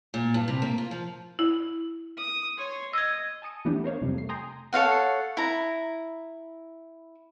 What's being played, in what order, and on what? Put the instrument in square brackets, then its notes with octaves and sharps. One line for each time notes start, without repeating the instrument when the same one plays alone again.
[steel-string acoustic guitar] A#2
G2
C3
A#3
F4
F3
[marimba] E4
[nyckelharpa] D#6
C#5 C6
[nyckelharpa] D#5 [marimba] E6 G#6
[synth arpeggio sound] G#5 A5 D#6 C#7 D#7
E3 A3 B3 D4 G4
A#4 C5 C#5 F5
F2 C3 G3
A3 C7
G5 G#5 A#5 C6 D#6
[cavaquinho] A4 C#5 F5 F#5
E4 A#5